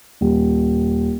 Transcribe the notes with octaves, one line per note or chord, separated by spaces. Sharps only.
D#1